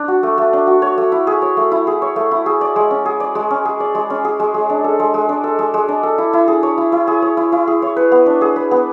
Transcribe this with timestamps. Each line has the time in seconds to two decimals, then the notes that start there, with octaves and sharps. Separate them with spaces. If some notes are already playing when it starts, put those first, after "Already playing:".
Already playing: D4
0.08 F#4
0.23 A3
0.38 A3
0.53 D4
0.67 F#4
0.82 C#5
0.98 A3
1.12 E4
1.27 G#4
1.42 C#5
1.57 A3
1.71 E4
1.87 G#4
2.02 C#5
2.16 A3
2.31 E4
2.46 G#4
2.61 D5
2.76 G#3
2.91 C#4
3.05 G#4
3.20 D5
3.35 G#3
3.50 C#4
3.65 G#4
3.80 D5
3.95 G#3
4.10 C#4
4.25 G#4
4.40 G#3
4.54 G#3
4.69 D4
4.84 A4
4.99 G#3
5.14 G#3
5.29 D4
5.44 A4
5.59 G#3
5.74 G#3
5.88 D4
6.03 A4
6.18 E4
6.33 E4
6.48 G#4
6.63 C#5
6.78 E4
6.92 E4
7.07 G#4
7.22 C#5
7.37 E4
7.52 E4
7.67 G#4
7.82 C#5
7.96 B4
8.12 B3
8.26 D4
8.41 G#4
8.56 B4
8.71 B3